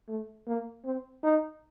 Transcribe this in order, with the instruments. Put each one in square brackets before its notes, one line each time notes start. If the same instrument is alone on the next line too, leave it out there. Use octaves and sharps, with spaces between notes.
[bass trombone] A3
A#3
C4
D#4